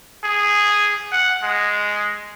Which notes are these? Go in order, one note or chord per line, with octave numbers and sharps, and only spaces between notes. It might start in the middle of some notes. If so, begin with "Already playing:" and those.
G#4
F#5
G#3